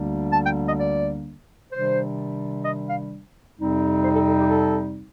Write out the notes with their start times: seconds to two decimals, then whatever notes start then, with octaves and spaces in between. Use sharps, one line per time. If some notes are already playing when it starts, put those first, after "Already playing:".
Already playing: D2 D3 G3 A#3 D4
0.32 A5
0.44 G5
0.67 D#5
0.79 D5
1.72 C3 D#3 G3 D4 C5
2.64 D#5
2.88 F5
3.57 F2 C3 G3 C4 D#4
4.04 C5
4.15 A4
4.27 A4
4.38 G4
4.49 A4